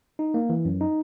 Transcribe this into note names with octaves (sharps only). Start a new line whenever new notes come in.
D#4
A#3
E3
F#2
D#4